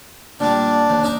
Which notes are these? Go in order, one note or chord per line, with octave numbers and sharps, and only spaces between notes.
A#2 G3 D4
D#2
D4 D#4 E5